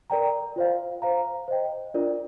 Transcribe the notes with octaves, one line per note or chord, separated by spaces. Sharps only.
A#4 D5 G5 A#5
F4 C5 F5
C5 F5 A#5
C5 D#5 G5
D4 F4 A#4 D5